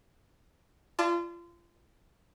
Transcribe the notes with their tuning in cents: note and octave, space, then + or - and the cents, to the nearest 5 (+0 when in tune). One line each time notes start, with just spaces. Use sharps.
F4 -30 D5 +15 A5 +0